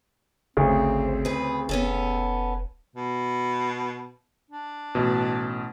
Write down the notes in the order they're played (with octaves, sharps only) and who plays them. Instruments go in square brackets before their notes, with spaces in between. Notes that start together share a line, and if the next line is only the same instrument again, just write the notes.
[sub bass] G#1 [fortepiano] D2 C#3 [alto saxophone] C4
[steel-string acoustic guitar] G#4 B4
[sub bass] F1 [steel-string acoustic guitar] B3 C#4 A4
[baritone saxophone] B2
D4
[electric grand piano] A1 B2